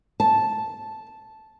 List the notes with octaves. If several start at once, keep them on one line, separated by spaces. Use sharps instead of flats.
A5